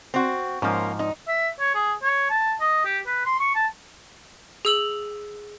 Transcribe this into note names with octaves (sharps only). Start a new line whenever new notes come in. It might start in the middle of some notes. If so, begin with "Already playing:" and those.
C4 F#4
G#2 F3 A#3 C#4
D#4
E5
C#5
G#4
C#5
A5
D#5
G4
B4
C6
C#6
A5
G#4 E6 F#7